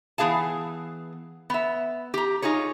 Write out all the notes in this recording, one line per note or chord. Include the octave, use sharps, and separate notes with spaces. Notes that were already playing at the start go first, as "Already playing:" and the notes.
E3 B3 G#4 F5 A5
B3 E5
G4 A#5
D#4 F4 G#4 C#5